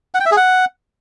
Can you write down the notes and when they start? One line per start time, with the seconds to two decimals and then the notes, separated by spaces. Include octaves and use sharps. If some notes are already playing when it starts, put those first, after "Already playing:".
0.15 F#5
0.20 G5
0.26 E5
0.31 G#4
0.37 F#5